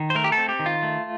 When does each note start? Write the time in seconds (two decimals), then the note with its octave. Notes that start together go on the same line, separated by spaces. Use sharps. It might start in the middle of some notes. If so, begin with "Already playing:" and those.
Already playing: D#3
0.10 C5
0.15 A3 A#4
0.24 G4
0.32 A4
0.38 C4
0.49 G4
0.59 D#3
0.66 F4
0.83 A3